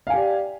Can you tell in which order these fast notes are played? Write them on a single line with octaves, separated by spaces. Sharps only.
F5 G#5 G4 D5